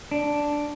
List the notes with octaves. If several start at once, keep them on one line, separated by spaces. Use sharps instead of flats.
D4